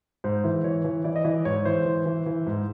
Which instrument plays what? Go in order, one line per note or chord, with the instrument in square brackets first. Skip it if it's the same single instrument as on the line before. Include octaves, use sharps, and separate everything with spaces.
[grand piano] G#2 C5
E3
E3 C#5
E3
E3 D5
D#5
E3 D5
G#2 C#5
E3 C5
E3
E3
E3
G#2